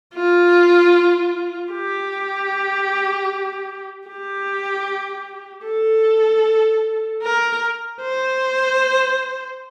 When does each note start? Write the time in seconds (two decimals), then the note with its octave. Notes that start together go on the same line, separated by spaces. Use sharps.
0.14 F4
1.72 G4
4.08 G4
5.66 A4
7.23 A#4
8.01 C5